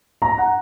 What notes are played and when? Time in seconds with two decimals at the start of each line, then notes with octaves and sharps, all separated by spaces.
0.22 A#5
0.38 F#5